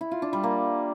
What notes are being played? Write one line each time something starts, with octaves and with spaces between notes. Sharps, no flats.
E4
F4
D4
G3
A#3